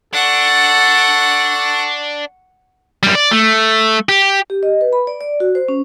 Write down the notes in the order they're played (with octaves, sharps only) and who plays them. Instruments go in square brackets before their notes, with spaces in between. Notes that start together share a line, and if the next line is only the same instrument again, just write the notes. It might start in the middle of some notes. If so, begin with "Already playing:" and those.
[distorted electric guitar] D4 [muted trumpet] A4 [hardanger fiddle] F#5 C#6
[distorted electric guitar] F#2 G3
D5
A3
G4
[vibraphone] G4
D#5
B4
B5
D5
D5
F#4
C5
C#4